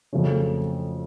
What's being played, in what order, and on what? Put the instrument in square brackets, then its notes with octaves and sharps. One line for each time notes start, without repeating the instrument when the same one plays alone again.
[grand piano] F2 C#3 F#3 A3 C#4